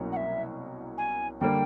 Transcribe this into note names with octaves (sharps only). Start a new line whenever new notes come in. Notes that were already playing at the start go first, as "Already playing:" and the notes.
Already playing: C2 B2 F#3 A#3 C#4
F#5
E5
G#5
D3 G3 A#3 G5